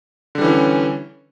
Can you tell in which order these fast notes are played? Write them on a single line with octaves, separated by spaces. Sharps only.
D3 G3 E3 C#4